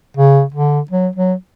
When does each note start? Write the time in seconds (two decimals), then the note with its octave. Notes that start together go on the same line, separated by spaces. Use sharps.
0.17 C#3
0.54 D3
0.90 F#3
1.16 F#3